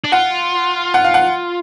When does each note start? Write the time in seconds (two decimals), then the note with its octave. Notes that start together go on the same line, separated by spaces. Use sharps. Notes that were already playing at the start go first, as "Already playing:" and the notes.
0.04 D4
0.12 F4 F#5
0.94 F#5
1.04 F5
1.14 F#5